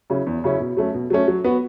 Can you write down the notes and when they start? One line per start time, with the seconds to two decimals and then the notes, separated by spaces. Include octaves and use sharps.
0.10 C#3 F#3 C#4 E4
0.27 E2
0.44 C#3 F#3 C#4 E4
0.60 B2
0.77 F#3 A3 C#4
0.94 B2
1.10 F#3 A3 C#4
1.28 F#3
1.44 B3 F#4